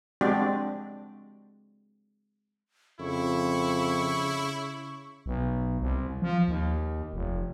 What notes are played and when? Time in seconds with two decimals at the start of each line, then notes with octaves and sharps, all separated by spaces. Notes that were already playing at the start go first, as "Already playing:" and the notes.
0.21 G#3 C4 D4 F#4 G4 D5
3.00 F2 C#3 E4 C#6
5.26 B1
5.81 C2
6.22 F3
6.48 D#2
7.14 F1